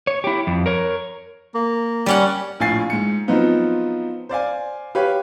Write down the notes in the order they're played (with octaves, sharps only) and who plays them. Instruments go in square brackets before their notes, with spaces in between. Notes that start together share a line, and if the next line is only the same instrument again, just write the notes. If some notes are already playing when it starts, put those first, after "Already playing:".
[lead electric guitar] C#5
E4 G4
F2
A#4 C#5
[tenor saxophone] A#3
[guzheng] G3 C#4 F#5
[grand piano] A#1 A2 F4 G#5 A6 C7
G#2 C#7
F3 F#3 B3 C4 D#4 F4
C5 D5 F5 G#5
G4 B4 C#5 F5